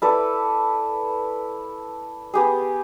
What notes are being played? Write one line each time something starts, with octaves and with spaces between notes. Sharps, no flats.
E4 A4 B4 D5
B3 G4 G#4